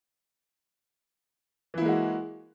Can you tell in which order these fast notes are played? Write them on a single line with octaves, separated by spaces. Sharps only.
E3 E4 A#3 G#3 F#4